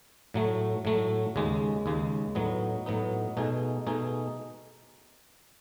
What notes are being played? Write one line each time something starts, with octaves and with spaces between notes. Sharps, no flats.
A2 F#3 A3
A2 F#3 A3
D#2 C#3 G#3
D#2 C#3 G#3
A2 F#3 B3 D#4
A2 F#3 B3 D#4
B2 A3 D#4 G#4
B2 A3 D#4 G#4